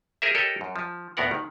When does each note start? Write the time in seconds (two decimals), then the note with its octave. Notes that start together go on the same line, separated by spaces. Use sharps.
0.22 G#4 A#4 C5 E5
0.35 G4 A4 A#4 C#5 D#5
0.61 F#2
0.76 F3
1.17 D2 A2 B3 A#4 F#5
1.31 D#3